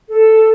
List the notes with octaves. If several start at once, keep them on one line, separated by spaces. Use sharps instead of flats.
A4